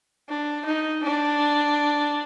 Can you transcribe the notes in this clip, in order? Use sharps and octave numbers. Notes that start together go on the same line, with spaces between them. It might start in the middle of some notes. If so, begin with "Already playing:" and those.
D4
D#4
D4